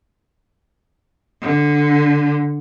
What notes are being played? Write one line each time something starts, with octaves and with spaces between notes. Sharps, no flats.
D3